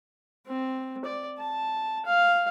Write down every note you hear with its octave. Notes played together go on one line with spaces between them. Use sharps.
C4
D5
A5
F5